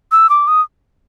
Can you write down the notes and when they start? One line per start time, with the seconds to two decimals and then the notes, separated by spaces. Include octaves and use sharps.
0.12 E6
0.30 D6
0.48 D#6